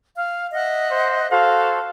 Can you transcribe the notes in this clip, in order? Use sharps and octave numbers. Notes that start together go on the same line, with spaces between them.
F5
D#5 E5 F#5
C5
F#4 A4 C5 F5